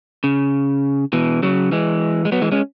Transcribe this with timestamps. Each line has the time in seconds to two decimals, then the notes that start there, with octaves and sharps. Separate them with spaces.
0.24 C#3
1.13 B2 E3
1.43 C#3 F#3
1.72 E3 G#3
2.25 G#3
2.32 F#3 B3
2.41 E3 G#3
2.52 G#3 C#4